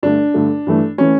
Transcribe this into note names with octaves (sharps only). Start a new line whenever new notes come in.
G2 D3 A3 D4
G2 D3 A3
G2 E3 A3
E3 A3 C#4